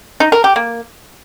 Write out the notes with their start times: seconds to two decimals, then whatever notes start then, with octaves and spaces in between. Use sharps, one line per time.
0.20 D#4
0.32 A#4
0.44 G4
0.56 A#3